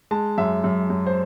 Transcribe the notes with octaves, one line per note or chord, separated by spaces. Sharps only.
G#3 A5
F#2 E5
F#2
F#2
C5